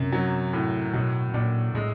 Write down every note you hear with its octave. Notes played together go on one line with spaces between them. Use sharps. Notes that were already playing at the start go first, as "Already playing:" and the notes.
Already playing: F#2 C3
F#3
A2
B2 F#3
A#2 D4
A2 G#3